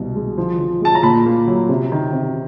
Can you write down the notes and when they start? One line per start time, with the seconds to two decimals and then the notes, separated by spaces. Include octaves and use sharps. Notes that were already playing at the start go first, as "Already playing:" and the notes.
Already playing: C2 B2
0.16 G#3
0.38 F3
0.59 F3
0.81 G#3 A5
0.95 A#5
1.03 A#2 B5
1.26 A#3
1.47 F#3
1.69 C3
1.92 D#3
2.13 C3